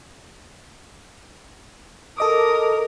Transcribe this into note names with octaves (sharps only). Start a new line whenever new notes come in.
A4 A#4 D#5 D6 D#6